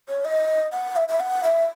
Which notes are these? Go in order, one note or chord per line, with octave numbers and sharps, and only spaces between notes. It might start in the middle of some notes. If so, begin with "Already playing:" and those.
C#5
D#5
F#5
E5
E5
F#5
E5